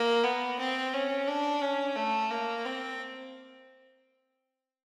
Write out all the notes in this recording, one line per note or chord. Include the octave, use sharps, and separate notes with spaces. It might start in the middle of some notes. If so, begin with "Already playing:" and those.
Already playing: A#3
B3
C4
C#4
D4
C#4
A3
A#3
C4